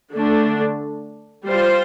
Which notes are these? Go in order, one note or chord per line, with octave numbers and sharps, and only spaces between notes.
D3 A3 D4
G3 F4 C5